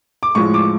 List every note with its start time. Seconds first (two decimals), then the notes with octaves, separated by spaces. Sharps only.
0.23 D6
0.35 A2 F3 G#3 C#6
0.54 D6